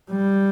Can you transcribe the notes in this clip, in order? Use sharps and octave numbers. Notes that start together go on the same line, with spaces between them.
G3